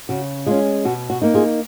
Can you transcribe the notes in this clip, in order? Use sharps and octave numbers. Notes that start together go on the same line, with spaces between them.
C#3 F#4
G#3 C#4 F4
B2 F#4
F#4
A#3 D#4
F4 G#4